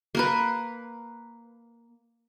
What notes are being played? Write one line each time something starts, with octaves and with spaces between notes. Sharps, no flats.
A#3 A#4 B4